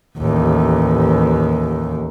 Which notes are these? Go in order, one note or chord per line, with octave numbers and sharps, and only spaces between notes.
A1 D#2